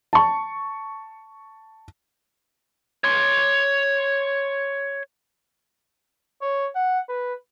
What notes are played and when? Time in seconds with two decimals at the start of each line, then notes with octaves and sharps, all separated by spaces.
0.13 A5 C#6
3.04 C#5 C6
6.42 C#5
6.75 F#5
7.09 B4